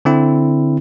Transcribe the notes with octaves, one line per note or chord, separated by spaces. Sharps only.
D3 C4 E4